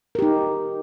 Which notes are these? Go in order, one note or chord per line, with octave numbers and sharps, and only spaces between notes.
D#4 G4 A#4